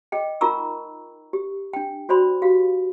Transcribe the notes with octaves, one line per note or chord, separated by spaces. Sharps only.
G#4 D#5 G5
D#4 F4 A#4 A#5 C#6 E6
G4
D4 G5
F#4 C5 D5 B5 C6
F#4 G4 F5